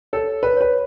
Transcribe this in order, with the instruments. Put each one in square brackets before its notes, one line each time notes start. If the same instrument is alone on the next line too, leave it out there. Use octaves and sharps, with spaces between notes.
[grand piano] A4 [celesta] C#5
[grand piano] B4
[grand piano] B4 [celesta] C#5